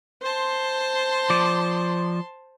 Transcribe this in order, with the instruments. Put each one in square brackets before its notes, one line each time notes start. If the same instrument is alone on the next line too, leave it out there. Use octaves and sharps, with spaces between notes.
[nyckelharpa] C5 [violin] A5 C6
[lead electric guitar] F3 D5